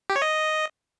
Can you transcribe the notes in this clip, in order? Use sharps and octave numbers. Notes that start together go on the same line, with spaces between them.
G4
C#5
D#5